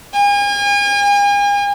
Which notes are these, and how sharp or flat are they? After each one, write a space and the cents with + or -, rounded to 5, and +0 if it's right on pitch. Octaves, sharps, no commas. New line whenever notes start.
G#5 -40